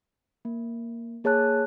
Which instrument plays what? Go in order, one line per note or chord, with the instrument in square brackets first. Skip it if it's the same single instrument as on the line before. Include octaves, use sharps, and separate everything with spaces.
[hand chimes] A#3
A#3 G#4 C#5 A5 F#6